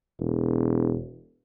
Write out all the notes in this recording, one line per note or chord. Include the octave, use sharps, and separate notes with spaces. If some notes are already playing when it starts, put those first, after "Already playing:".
E1